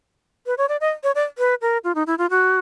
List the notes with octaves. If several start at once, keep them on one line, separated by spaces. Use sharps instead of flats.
B4
C#5
D5
D#5
C#5
D5
B4
A#4
F4
D#4
E4
F4
F#4